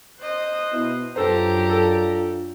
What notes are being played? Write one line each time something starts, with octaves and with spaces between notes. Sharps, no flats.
C5 D#5 F#6
B2 E4
F#2 D4 F4 G4 A4 C5 A#5
A4